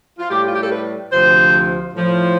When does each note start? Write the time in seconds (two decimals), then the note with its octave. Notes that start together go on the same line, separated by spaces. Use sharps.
0.19 F4
0.29 A2 G3 G4
0.46 F4
0.54 G4
0.62 A4
0.71 B4
1.11 D2 C3 F3 C5
1.93 A2 F3